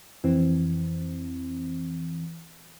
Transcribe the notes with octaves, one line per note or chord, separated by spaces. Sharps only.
F2 E3 C4